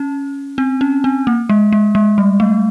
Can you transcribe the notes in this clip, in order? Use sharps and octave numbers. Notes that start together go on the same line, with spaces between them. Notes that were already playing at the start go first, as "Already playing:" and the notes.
Already playing: C#4
C4
C#4
C4
A#3
G#3
G#3
G#3
G3
A3